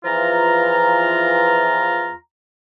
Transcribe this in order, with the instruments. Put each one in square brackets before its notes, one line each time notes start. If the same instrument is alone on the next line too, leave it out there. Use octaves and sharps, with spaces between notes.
[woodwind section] E2 E3 F3 F4 A#5